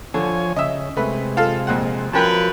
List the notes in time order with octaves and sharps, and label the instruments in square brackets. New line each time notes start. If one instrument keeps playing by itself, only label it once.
[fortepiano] D3 [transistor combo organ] F3 C#5 G#5
[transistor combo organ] C#3 [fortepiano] D#5 E5
[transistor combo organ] C3 G#3 [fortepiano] A3 B4
[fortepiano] F4 A4 F5
F2 A#2 F#5
[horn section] F#2 A#4 B4 [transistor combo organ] F3 [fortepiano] G5 A5